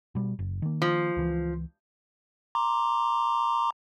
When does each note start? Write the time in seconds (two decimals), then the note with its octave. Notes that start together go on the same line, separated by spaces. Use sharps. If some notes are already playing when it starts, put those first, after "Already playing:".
0.15 B2 G3
0.39 F#1
0.62 D#3 A#3
0.82 F3
1.17 C#2 E3
2.55 A#5 C6 D6